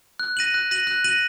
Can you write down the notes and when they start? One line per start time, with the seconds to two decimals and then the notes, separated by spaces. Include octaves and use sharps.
0.19 F#6
0.37 A#6 D#7 F#7
0.54 F#6
0.71 A#6 D#7 F#7
0.87 F#6
1.04 A#6 D#7 F#7